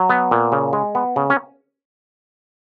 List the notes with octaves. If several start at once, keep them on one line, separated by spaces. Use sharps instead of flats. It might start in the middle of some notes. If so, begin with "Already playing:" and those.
Already playing: F#3
B3
A#2
C#3
G#3
B3
C#3
C#4